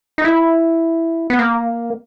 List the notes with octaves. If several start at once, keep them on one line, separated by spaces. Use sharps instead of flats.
D#4
E4
B3
A#3